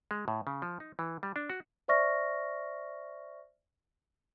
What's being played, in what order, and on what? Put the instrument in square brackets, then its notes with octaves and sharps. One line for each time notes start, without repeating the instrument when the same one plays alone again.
[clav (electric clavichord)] G#3
A2
C#3
F3
D#4
E3
G3
D4
F#4
[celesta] C5 D5 E5 C#6 F6 A#6